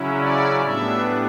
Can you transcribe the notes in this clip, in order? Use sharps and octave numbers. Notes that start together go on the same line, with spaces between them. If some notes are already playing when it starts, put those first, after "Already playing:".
Already playing: C#3 F#3 C#4 E4
D5
A2 G3 B3 D4 E5